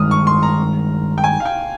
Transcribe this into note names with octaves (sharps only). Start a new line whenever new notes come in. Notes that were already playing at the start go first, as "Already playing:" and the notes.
Already playing: G2 D#3 G#3 D#6 F6
C#6
C6
A#5
G5
G#5
F5
G5